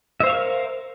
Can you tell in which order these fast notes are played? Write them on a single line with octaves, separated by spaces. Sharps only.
E5 C5 F5 C#6 A#4